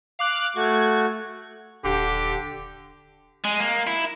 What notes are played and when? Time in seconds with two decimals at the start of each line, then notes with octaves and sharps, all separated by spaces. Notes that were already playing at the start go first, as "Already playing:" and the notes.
0.19 F5 D6 F#6
0.56 A3 F#4 G#6
1.84 D#1 D3 G4
3.44 G#3
3.60 A#3
3.87 E4